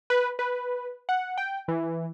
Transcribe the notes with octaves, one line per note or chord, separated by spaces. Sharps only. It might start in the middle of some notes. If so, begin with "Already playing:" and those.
B4
B4
F#5
G5
E3